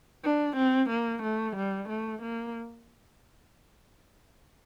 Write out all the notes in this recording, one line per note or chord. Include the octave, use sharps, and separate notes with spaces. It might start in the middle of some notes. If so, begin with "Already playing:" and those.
D4
C4
A#3
A3
G3
A3
A#3